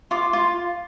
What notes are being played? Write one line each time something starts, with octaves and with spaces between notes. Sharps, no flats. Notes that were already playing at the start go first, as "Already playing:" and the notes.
F4 D6
F4